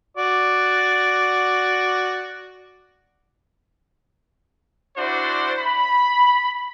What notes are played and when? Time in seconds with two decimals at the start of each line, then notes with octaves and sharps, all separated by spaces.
0.17 F#4 D5
4.97 D4 E4 F#4 C5 D5
5.59 B5